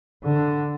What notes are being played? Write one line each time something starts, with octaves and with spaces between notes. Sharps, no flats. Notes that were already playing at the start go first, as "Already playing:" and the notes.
D3